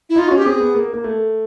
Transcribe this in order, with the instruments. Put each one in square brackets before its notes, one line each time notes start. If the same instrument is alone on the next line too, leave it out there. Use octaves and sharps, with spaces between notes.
[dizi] E4
[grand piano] D#4 [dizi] F4
[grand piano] C#4 [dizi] F#4
[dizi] G4
[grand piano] C4 [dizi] G#4
[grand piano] B3
A#3
A#3
A3